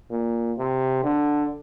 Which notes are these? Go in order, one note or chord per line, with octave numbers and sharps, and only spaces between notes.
A#2
C3
D3